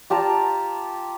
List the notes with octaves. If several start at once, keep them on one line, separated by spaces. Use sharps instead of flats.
F4 G4 A5 A#5